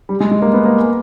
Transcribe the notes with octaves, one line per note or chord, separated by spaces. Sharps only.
G3
G#3
G#3
A#3
B3
A#3